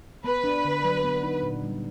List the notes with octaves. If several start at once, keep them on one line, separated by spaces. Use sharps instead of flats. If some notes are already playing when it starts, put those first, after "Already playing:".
B3 B4
D4
D3
F#3
B3
D#4
A#2
G3